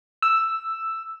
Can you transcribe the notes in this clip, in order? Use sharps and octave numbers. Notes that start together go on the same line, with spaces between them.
E6